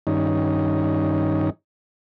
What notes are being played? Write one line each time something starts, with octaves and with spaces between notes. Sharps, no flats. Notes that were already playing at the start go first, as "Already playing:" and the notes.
G2 D#3 C#4 D#4